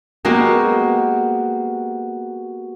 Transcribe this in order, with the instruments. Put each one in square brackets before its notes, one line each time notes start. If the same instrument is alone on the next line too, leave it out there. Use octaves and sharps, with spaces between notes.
[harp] G#3 A#3 B3 F#4 G4